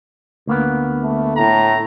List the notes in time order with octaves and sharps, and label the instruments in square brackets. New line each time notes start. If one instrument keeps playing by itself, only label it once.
[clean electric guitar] D2 A#3 B3
[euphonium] A3
[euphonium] A2 [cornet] A#5